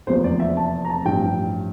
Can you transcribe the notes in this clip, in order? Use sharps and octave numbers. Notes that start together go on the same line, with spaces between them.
F1 E2 C3 F3 A#3 C5
D5
E5
A5
A#5
A5
A1 G2 F3 G5